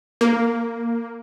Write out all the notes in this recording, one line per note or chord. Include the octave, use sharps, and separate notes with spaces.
A#3